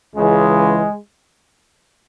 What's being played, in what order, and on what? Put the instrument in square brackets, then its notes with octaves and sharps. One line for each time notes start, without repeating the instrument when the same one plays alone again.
[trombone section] C#2 C#3 E3 G#3